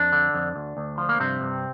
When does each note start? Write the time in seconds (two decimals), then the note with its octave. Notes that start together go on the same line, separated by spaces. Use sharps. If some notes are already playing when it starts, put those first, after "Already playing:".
Already playing: F2 D4
0.12 D3
0.34 F2
0.56 D2
0.77 D2
0.98 F3
1.09 A#3
1.19 G2 C3 C4
1.41 G2